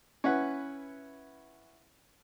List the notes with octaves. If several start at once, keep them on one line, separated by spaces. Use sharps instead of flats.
C#4 E4 B4 F#5